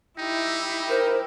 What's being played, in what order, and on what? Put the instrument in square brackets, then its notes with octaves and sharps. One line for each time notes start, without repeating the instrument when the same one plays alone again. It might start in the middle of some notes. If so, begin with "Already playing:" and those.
[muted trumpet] D#4 [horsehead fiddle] E4 G4
[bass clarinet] A#4 [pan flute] C5